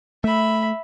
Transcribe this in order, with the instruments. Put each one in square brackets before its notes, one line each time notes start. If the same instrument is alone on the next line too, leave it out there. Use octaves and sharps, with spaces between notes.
[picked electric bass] A3 [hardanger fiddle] E5 B5